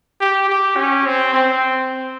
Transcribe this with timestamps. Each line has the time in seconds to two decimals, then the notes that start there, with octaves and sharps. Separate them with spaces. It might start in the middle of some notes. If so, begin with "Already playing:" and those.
0.21 G4
0.49 G4
0.76 C#4
1.06 C4
1.33 C4